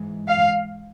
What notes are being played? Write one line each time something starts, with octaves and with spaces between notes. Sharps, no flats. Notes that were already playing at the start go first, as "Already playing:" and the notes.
Already playing: G#2 E3 G#3
F5